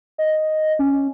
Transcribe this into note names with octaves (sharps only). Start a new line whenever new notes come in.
D#5
C#4